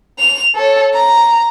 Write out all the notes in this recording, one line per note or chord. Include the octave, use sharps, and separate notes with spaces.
F7
A4 C#5
A#5